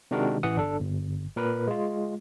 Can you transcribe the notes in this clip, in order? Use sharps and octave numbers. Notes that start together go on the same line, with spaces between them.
C3 D#3 G#3 D4 F#4 A#4
A1 E3 F#5 D#6
G1 D4 A4
G1
A#2 A#4 B4
G#3 F4